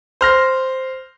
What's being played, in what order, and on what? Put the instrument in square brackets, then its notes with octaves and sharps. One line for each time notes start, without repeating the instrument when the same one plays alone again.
[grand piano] C5 F6 A#6